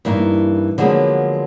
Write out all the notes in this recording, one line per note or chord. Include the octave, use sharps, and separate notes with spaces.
G2 E3 A#3 D#4
D3 F3 F#3 G#3 A#3 B3